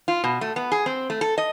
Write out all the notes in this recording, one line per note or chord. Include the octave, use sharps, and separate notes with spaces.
F4
B2
A3
B3
G#4
C4
A3
A4
D#5